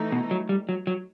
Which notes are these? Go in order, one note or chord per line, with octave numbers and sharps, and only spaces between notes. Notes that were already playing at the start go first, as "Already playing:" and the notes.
Already playing: E3 A3 D#4
B2
F#3
G3
F#3
F#3